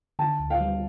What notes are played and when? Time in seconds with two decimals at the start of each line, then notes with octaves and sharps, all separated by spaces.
0.19 D3 G5 A5
0.39 D2
0.50 F5 G5
0.60 G3